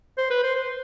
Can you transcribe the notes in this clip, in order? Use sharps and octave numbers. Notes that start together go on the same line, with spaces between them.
C5
B4
C5
C5